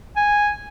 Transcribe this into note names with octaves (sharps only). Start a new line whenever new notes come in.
G#5